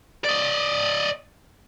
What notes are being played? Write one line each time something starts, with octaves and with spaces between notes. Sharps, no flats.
D5 D#5